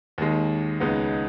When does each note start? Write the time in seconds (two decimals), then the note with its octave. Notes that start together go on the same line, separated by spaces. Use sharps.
0.18 D#2 D#3 G#3
0.80 C#2 C#3 G#3 B3 D#4